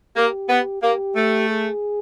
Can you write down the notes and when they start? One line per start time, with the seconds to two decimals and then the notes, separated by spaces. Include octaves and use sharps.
0.16 A#3 G4
0.49 B3
0.82 A#3 G4
1.16 A3
1.49 G#4